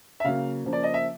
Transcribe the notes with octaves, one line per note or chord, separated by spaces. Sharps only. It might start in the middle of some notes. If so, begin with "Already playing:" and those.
E5
C#3 F#3 A#3 F5
C#3 F3 A#3
D5
D#5
E5